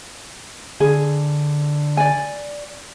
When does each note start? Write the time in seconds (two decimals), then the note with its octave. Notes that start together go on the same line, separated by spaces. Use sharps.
0.80 D3 G#4
1.97 D5 G#5